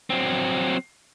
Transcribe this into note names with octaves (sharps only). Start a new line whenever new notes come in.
F#3 C4